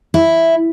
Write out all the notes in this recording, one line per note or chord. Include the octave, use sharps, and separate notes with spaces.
E4